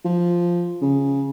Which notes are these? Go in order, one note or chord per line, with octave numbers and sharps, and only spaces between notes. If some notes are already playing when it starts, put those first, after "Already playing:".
F3
C#3